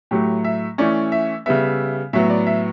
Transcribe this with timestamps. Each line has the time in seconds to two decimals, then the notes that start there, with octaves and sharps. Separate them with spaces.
0.11 A2 F#3 A3 G4
0.44 E5
0.78 E3 A3 C#4 D5
1.12 E5
1.46 C#3 G3 B3 E5
2.13 A2 F#3 B3 E5
2.30 D5
2.47 E5